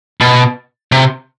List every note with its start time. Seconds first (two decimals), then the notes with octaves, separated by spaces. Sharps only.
0.21 B2
0.92 C3